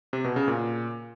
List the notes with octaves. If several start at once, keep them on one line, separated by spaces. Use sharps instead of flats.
C3
B2
C#3
A#2